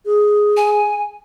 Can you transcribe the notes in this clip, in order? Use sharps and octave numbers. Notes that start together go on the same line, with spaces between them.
G#4
G#5